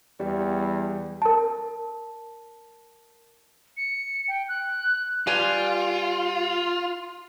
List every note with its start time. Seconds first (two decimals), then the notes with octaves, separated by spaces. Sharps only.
0.19 E2 G3
1.22 A#4 A5
3.77 C#7
4.28 G5
4.48 F#6
5.27 G3 F4 B4 G#5